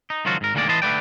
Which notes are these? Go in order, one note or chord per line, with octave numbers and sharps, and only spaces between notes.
D#4
C#2 D#3 F3 F#3 F4 F#4
G#2 A#4
D2 A#2 D#3 G#3 A#3 D5
A2 E3 B4 D#5 A5 C6
D3 A3 B4 D5 G5